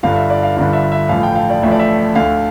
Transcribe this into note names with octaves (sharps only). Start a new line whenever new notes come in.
G1 G2 D3 F5
E5
D5
F5
G1 G2 D3 F5
E5
E5
A1 A2 F3 A3 F5
G5
F5
D5
A1 A2 F3 A3 E5
D5
E5
D2 D3 A3 F5